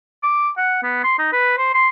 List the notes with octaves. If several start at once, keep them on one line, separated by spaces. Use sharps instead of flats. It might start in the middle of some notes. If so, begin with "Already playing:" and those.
D6
F#5
B3
C6
D#4
B4
C5
C6